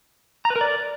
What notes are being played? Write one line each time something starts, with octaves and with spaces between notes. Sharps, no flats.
A#5
B4
A#4
D5